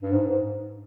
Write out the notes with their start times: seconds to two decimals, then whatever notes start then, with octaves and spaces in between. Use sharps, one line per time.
0.02 G2
0.13 G#2
0.28 G#2